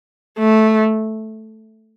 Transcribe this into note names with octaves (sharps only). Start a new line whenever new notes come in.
A3